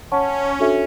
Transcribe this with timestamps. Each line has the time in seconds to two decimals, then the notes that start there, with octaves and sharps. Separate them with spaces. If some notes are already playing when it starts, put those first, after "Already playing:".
0.12 C#4 C#5 F#5 A5 C#6
0.59 D4 F#4 A4 E5